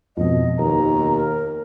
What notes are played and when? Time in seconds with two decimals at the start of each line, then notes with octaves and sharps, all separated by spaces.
0.17 F2 B2 D#5
0.58 D#2 A#5
1.16 A#4